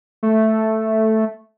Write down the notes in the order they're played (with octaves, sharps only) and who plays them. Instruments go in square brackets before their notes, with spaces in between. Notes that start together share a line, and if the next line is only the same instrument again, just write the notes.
[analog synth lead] A3